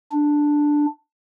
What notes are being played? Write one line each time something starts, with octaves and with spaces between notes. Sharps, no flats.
D4